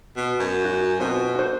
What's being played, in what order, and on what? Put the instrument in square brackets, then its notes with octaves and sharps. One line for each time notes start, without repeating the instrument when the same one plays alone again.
[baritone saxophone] B2
F#2
[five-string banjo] F#4
[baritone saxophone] B2 [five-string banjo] C4 F4 C5
[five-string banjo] F#4 C5